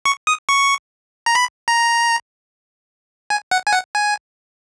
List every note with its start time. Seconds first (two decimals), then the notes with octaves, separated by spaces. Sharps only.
0.05 C#6
0.27 D#6
0.49 C#6
1.26 A#5
1.35 B5
1.68 A#5
3.30 G#5
3.51 F#5
3.67 G#5
3.73 F#5
3.95 G#5